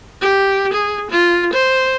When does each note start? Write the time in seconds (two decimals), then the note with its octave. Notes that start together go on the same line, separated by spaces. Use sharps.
0.22 G4
0.73 G#4
1.11 F4
1.53 C5